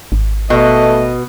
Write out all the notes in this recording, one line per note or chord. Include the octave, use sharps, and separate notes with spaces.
G#1
B2 A3 D#5